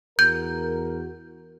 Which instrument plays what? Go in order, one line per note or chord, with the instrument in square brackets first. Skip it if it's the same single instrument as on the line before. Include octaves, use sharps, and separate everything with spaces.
[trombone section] E2 F#4 A#4 [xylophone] G6